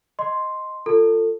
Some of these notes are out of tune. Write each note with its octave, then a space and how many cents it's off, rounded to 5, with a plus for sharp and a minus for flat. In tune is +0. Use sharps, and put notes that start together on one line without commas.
D#5 +0 C6 +0
F4 +0 A4 +25